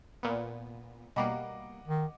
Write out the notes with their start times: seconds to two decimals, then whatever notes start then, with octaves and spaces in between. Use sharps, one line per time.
0.23 A#2 B3
1.16 B2 G3 A#3 D#5 F#5 D6
1.88 D#3